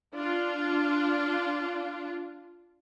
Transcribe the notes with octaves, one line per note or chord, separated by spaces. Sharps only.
D4 F4